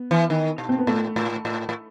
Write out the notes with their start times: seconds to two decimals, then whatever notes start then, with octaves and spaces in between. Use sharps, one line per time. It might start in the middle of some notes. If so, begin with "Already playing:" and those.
Already playing: B3
0.11 E3
0.30 D#3
0.58 B2
0.69 C4
0.78 B3
0.87 A2 A3
1.16 A2
1.45 A2
1.69 A2